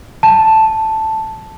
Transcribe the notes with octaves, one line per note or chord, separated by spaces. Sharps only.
A5